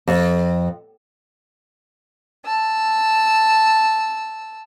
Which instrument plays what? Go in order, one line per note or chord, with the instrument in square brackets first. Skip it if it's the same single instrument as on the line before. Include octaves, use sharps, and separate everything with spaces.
[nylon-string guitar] F2
[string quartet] A5 E6